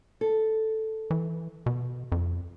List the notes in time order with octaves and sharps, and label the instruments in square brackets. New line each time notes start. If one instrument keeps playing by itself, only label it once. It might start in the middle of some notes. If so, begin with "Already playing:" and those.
[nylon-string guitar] A4
[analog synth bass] E3
B2
F2